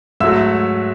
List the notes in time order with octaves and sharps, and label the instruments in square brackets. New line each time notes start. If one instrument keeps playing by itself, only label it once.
[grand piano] G#2 F#3 A3 E5 E6